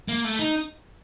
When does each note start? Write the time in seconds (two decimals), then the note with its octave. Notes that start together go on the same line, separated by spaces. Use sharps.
0.08 A#3
0.24 A3
0.39 D#4